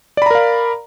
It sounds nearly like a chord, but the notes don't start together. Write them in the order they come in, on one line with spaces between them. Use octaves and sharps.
D5 B5 A#5 A#4 F5